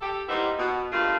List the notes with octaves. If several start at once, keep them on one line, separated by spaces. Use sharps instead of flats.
G4 A4
G3 A#3 B3 D#4 E4 C5
B2
G2 A3 A#3 F4